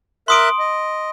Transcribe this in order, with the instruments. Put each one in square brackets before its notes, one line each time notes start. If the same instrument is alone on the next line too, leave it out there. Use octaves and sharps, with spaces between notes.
[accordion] A#4 E5 F#6 [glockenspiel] C6 D#6 D7
[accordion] D#5